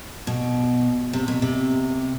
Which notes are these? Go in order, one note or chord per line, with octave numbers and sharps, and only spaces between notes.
B2
C3
B2
C3